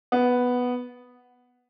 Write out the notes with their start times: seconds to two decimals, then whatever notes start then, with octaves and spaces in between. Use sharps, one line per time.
0.12 B3